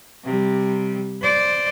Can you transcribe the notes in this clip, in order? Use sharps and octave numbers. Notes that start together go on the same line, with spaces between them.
C3 G3
C5 D5